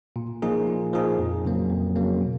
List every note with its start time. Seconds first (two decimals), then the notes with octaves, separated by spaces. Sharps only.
0.16 A#2
0.42 F3 A#3 D#4 G#4
0.67 A#2
0.93 F3 A#3 D#4 G#4
1.18 F2
1.45 C#3 F#3 A#3
1.70 F2
1.96 C#3 F#3 A#3
2.21 B2